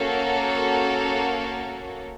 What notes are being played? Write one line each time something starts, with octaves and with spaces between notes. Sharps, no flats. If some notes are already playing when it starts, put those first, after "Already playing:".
Already playing: A#3 C#4 F#4 A4